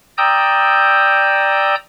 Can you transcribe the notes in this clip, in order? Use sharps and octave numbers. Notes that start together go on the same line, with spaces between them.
D5 G5 A#5 D#6 E6 G6